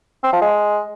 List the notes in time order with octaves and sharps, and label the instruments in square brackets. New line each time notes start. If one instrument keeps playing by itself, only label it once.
[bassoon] C4
F3
G#3